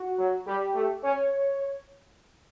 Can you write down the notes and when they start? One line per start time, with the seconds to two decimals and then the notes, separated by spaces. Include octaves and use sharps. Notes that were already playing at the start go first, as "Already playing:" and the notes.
Already playing: F#4
0.18 F#3
0.47 G3 G4
0.75 A3
1.03 C#4 C#5